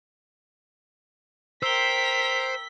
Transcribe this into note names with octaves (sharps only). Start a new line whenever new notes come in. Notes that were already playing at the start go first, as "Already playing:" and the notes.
A#4 C5 G5 E6 B6 G7